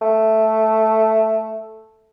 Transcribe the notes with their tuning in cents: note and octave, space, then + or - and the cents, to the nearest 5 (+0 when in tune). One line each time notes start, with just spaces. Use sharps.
A3 +0